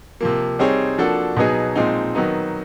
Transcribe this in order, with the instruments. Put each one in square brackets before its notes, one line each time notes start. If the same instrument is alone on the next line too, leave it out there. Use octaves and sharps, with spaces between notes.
[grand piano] C3 F3 A#3
G3 C4 D#4 G#4 C#5
F3 A#3 D4 F#4 A4
B2 F#3 B3 D#4 G#4
A#2 F3 G#3 C4 D#4
D#3 F#3 B3 D#4